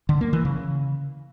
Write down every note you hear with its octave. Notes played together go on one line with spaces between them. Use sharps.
D3
A#3
E3
C#3